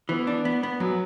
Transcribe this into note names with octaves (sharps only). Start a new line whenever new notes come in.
E3 B3
D4
B3
B3
F#2 F#3